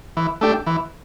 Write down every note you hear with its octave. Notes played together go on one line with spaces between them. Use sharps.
E3
A3 D4 G4
E3